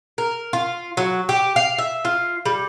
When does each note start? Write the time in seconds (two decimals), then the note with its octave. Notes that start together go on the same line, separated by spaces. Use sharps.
0.18 A#4
0.53 F4
0.97 F#3
1.29 G4
1.56 F5
1.78 E5
2.05 F4
2.45 G3